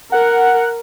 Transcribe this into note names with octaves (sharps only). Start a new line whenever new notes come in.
A#4 F#5